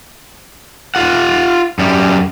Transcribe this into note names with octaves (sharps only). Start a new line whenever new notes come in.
F4 F#5
F#2 G3